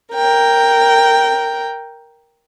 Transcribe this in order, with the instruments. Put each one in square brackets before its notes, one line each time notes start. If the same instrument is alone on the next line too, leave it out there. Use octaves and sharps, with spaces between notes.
[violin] A#4 G5